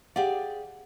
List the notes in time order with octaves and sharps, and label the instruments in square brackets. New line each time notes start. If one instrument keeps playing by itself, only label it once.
[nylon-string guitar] G4 G#4 D5 [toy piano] F5 F#5